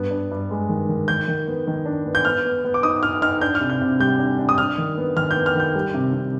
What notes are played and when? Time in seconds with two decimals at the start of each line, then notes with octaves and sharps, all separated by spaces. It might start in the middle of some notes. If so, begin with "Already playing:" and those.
Already playing: G2 B3
0.11 D4
0.31 G2
0.51 G#3
0.69 D#3
0.89 D#3
1.08 D#3 G6
1.28 D#3
1.48 B3
1.67 D#3
1.86 D4
2.06 B3
2.15 G6
2.25 B3 F6
2.45 B3
2.65 B3
2.74 D6
2.83 D#4 D#6
3.03 D#4 F6
3.22 D#4 F6
3.41 D4 G6
3.55 F6
3.61 C3
3.70 G6
3.81 C3
4.00 G3 G6
4.19 D4
4.39 D4
4.49 D#6
4.58 D4 F6
4.78 D#3
4.97 B3
5.16 D#3 F6
5.31 G6
5.36 B3
5.46 F6
5.55 D#3 G6
5.75 G3
5.94 C3
6.13 C3